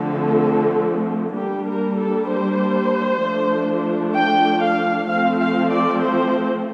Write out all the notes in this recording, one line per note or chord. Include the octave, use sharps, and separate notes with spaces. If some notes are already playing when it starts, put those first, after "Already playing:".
Already playing: D3 F3 A3 C4 A4
G3 A#3 D4 G4
A#4
A4
C5
F3 A3 D4
G5
F5
F3 A3 C4 F5
F5
D5
C5